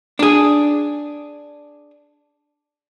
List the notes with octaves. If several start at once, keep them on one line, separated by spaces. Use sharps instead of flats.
D4 G#4